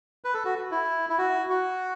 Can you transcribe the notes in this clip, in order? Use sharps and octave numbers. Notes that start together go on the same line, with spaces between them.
B4
A4
F#4
E4
E4
F#4
F#4